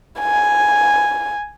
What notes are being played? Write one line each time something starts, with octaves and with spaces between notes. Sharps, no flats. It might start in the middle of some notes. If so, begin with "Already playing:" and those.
G#5